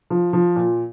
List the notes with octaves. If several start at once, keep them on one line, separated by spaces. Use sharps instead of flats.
F3
F3
A#2